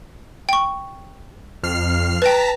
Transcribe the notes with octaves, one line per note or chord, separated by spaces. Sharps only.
G5 C#6
F2 F6 C7
B4 G5 A5 A#5 B6